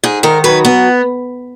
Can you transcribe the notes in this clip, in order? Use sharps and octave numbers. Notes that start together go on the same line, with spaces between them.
G#2 G#4
D#3 A#4
F#3 B4
B3